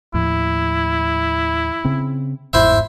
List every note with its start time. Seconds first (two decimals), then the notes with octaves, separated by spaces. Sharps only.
0.14 D#2 A2 F3 E4
1.85 C#3 C4
2.53 G1 E2 G#2 E4 C5 E5